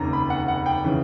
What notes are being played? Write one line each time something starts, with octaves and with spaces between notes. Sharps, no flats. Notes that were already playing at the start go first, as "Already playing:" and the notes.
Already playing: F1 D#2 C#3 A#5
B5
F#5
F#5
G5
C#3 E3